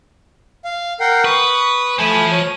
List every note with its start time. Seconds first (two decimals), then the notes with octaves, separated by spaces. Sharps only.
0.65 F5
1.00 A#4 F#5 G5 C7
1.25 B4 C#6 D#6
1.98 A3 C5 G#5 A5 B5 D#7
2.31 C#5